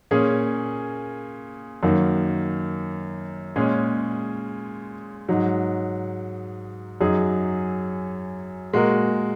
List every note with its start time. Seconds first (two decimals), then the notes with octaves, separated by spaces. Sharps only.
0.11 A#2 A#3 C#4 G#4
1.83 F#2 D#3 A#3 F#4
3.56 A#2 G#3 C#4 G#4
5.28 G#2 F#3 D#4
7.01 F#2 F#3 D#4 G#4
8.73 A#2 G#3 F#4 A#4